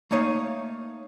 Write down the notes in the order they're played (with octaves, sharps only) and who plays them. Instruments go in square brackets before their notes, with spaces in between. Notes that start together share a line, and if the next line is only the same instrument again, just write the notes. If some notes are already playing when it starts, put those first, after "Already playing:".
[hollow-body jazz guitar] A3 A#3 D#4 C#5 D#5 F5